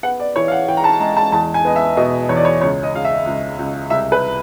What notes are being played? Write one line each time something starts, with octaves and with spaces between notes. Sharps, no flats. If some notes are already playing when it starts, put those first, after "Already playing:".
B3 F#5
D5
E3 C#5
F5
F#5
E3 G5
A#5
A5
G#3 A#5
A5
E2 A5
G#5
B3 D#5
E5
B2 D#5
E2 C#5
D5
C#5
C#2 C#5
D#5
C#2 F5
E5
C#2
C#2
C2 E5
B4